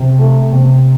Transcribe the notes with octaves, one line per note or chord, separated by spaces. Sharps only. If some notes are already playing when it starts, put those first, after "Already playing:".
Already playing: C3
A3
C3